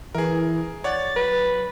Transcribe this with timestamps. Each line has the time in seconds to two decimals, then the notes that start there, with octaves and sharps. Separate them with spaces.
0.15 E3 G#4 A#4
0.84 C#5 D5 F#5 A6
1.16 F#3 B4